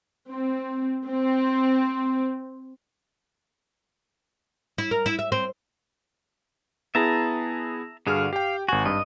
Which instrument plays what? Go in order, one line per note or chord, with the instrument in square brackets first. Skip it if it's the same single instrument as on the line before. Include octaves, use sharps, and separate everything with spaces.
[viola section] C4
C4
[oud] E4
A#4
E4
E5
C4
[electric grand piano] B3 E4 G#4 [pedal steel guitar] E5 A5 A#5
[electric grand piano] G2 G#4 F6 [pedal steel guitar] D3 F#4 F5
[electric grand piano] G4 G5 [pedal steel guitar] F5
[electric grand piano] G#1 G#5 [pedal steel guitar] F#4
[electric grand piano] G2 [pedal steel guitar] D#5